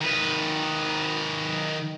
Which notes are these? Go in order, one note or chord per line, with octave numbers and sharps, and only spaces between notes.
D#3 B4